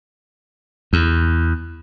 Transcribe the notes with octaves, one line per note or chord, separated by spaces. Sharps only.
E2